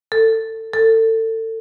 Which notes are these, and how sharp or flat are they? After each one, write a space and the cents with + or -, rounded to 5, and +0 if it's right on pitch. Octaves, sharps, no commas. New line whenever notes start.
A4 +25
A4 +30